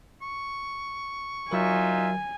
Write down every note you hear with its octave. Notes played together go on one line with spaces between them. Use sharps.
C#6
F#3 D#4 F4 A#4 E5 G#5